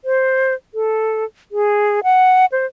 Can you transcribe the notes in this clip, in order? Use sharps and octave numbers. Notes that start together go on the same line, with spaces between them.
C5
A4
G#4
F#5
C5